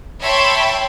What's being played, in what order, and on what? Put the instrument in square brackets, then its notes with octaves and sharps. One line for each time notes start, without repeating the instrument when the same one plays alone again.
[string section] C#5 E5 G5 A5 B5 C6